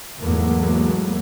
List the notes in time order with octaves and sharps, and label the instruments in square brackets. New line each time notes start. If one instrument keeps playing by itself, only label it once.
[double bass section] E2 G#2 F#3 A3 A#3